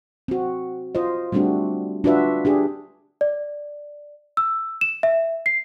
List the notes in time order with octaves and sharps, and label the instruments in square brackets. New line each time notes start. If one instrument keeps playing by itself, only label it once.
[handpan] C4 F#4
F4 C5 D#5
G3 A3 C4 D4 F#4
D4 F4 F#4 B4 E5
D4 G4 G#4
[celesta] D5
E6
E7
E5
C7